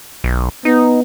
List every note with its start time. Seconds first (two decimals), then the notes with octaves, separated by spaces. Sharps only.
0.24 B1
0.65 B3 D#4